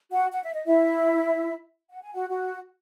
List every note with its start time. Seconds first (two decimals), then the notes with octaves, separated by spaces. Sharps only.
0.12 F#4 F#5
0.32 F#5
0.43 E5
0.54 D#5
0.66 E4 E5
1.91 F#5
2.02 G#5
2.14 F#4 F#5
2.30 F#4 F#5